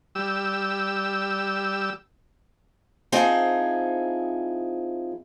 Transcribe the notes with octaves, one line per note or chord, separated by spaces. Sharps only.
G3 E6
F3 C4 D#4 E4 G#4